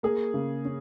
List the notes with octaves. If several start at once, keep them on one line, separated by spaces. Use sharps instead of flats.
A#3 G#4
C#3
C#4